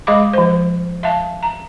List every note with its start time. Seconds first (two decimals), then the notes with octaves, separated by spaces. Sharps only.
0.07 G#3 G#4 D#5 F5 B5 D6
0.33 F3 C5
1.03 E5 F5 A5
1.43 A#5